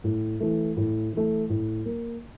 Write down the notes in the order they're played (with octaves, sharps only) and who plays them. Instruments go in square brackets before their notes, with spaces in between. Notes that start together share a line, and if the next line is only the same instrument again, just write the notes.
[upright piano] A2
E3 A3
A2
E3 A3
A2
A#3